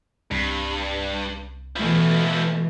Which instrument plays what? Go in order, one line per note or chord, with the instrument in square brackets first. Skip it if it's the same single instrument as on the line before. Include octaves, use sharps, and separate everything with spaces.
[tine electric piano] C2 [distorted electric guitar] G2
[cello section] B2 E3 A3 [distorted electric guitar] F3 E4